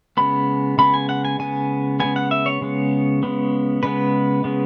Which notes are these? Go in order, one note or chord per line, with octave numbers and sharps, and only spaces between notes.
C#3 G#3 B3 B5
C#3 G#3 B3 B5
G#5
F#5
G#5
C#3 G#3 B3 G#5
C#3 G#3 B3 G#5
F#5
E5
C#5
C#3 G#3 B3
C#3 G#3 B3
C#3 G#3 B3 B4
C#3 G#3 B3